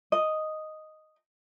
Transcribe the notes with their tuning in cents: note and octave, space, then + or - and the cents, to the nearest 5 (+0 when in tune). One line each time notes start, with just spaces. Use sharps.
D#5 +0